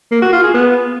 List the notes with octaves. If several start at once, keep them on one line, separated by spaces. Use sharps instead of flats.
A#3
F#4
F4
G#4
B3